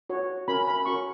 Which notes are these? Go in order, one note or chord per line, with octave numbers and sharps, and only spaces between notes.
F#4 C#5
C#4 F#4 A#4 B5
B5
C#4 F#4 A#4 C#6